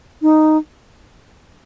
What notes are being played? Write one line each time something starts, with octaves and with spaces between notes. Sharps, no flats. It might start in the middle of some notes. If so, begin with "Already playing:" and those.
D#4